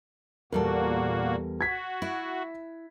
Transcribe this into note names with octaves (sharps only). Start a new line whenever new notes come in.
E2 A#2 G3 A#3 F#4 A4 A#4
F#4 G#6 B6
E4